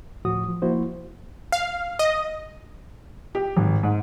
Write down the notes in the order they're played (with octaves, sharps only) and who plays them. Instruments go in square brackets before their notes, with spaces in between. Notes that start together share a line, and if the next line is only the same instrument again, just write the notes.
[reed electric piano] D2 A2 F3 F#4 D#6
F3
F3 A#3 E4 F#4 C5
[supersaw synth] F5
D#5
[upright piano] G4
G#1
G#2